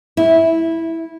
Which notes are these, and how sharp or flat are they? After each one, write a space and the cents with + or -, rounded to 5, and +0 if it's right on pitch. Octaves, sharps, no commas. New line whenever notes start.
E4 -10